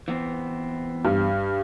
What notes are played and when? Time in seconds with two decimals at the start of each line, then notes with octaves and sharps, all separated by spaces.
0.08 E3 B3 C4
1.05 G2